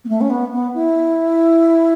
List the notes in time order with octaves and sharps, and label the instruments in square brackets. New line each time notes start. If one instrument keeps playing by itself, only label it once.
[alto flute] B3
A3
C#4
B3
B3
E4